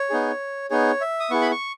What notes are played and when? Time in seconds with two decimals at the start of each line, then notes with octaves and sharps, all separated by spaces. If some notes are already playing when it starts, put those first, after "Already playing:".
Already playing: C#5
0.10 B3 D#4 G#4
0.70 B3 D#4 G#4 C#5
1.01 E5
1.20 D#6
1.31 B3 E4 G#4 C#6
1.41 B5
1.51 C#6